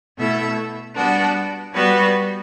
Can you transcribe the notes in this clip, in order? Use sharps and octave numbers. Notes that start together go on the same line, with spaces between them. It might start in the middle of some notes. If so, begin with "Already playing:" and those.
B2 A3 E4 A4 E5
G3 B3 D4 F#4
G3 B3 F#4 B4